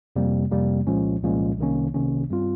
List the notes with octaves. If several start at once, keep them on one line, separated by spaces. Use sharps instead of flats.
F2 C3 G3 A#3
F2 C3 G3 A#3
C2 A#2 F3 G#3 C#4
C2 A#2 F3 G#3 C#4
C2 C3 D#3 A#3 C#4
C2 C3 D#3 A#3 C#4
G2 G3 C4 F4